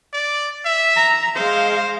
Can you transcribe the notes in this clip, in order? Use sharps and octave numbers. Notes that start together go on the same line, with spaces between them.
D5
E5
A#5
G#3 C5 F5